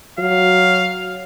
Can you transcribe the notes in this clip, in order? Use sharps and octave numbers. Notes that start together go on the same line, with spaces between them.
F#3 F5